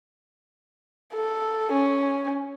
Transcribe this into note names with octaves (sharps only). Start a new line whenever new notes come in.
A4
C#4